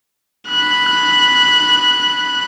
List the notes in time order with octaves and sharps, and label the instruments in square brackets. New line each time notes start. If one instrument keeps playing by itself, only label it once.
[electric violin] B5 F#6